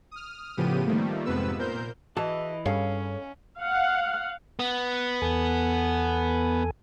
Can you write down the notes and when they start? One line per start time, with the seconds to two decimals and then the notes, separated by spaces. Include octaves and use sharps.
0.11 D#6 F6
0.57 A2 C#3 F3 B3 G4 D#7
0.87 D#3 F3 G3 A3 A#3
1.26 F2 G#2 C3 B3 B4 E6
1.59 A#2 A#4 C5 G6
2.17 E3 F#4 G#4 D#5 A5
2.66 G2 C#4 G#4 A4 C#5 F5
3.59 F5 F#5
4.59 B3
5.22 E2 A4 G#5